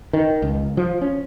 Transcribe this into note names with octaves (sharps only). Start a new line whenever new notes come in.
D#3
C#2
F3
C#4